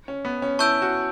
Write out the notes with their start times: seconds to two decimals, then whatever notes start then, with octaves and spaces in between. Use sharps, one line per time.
0.08 C#4
0.25 B3
0.42 C#4
0.59 E4 A5 C#6 E6 G6 D7
0.82 F#4